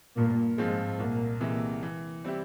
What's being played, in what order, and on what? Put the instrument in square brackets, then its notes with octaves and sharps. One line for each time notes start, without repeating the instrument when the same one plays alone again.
[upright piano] G2 [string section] A#2 A#3
[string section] G#2 G#3 [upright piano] F3 C4 F4
[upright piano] C2 [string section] A#2 A#3
[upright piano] C3 E3 G#3 E4
E3
G3 C4 E4 G4